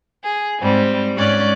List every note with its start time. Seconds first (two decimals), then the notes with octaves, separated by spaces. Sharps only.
0.24 G#4
0.60 G#2 G3 C4
1.16 G#2 C#4 D5 F#6